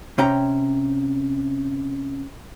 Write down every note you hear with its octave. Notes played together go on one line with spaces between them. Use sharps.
C3 C#4 G5 A#5